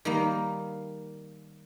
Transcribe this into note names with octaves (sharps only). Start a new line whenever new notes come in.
D#3 G3 A#3